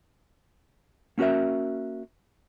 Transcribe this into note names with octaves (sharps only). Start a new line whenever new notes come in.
A#3 C#4 F#4 A#4 E5